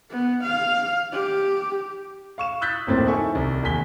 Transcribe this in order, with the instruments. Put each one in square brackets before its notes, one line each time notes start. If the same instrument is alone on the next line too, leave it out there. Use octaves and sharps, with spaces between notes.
[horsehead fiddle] B3
F5
G4
[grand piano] F5 C#6 E7
D#6 E6 F#6 G6 A6 B6
D1 F2 A2 A#3 C4 A6
D#4 E4 A4 E5 G#5 C#6
C2
E1 D#2 G#5 B6 G7